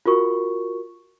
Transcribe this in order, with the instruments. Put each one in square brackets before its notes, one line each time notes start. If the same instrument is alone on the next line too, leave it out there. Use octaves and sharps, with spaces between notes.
[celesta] F4 F#4 A#4 C#6